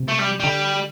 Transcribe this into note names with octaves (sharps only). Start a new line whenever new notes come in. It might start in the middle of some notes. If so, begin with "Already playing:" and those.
Already playing: C3
A3
G3
D3 G3